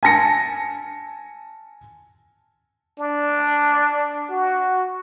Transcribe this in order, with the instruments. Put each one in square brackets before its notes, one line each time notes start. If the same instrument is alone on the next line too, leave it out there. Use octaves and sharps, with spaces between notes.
[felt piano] G#5 A5 A#6 C#7
[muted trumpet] D4
F#4